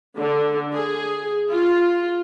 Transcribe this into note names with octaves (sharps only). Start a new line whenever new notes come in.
D3
G#4
F4